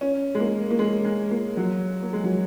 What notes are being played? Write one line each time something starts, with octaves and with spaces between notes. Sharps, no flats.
C#4
G#3
A#3
A#3
G#3
G#3
A#3
F#3
A#3
G#3
F#3